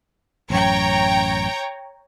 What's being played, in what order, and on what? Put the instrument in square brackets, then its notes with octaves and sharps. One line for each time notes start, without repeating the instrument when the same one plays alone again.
[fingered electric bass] A1 F#2 [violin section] C#5 G5 A#5